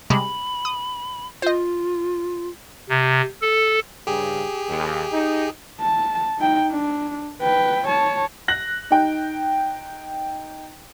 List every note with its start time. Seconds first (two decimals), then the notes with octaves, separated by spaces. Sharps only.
0.10 C3 G3 G#3 B5
0.65 D#6
1.42 F4 C5 D#5
2.89 C3
3.42 A4
4.07 G2 C#3 G4 G#4
4.68 D#2
5.12 D#4
5.81 A5
6.38 D#4 G5
6.71 D4
7.42 B4 G5
7.87 C#5 A5
8.48 F#6 A#6 F#7
8.91 D#4 G5